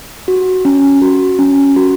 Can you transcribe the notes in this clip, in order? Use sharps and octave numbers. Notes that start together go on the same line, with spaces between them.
F#4
C#4
F#4
C#4
F#4